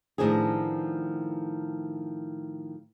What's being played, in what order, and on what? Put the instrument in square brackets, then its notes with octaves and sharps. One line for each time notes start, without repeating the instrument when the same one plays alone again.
[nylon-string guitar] A2 D#3 F3 B3 D4 G#4